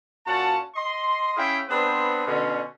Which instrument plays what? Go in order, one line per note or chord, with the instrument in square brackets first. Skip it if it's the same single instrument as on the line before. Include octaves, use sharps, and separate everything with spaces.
[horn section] A#2 C#4 F#4 F#5 A5
D#5 C6
C#4 E4 G#4 E5 F5 G5
B3 C4 D4 G#4 B4 C5
B2 D3 C#4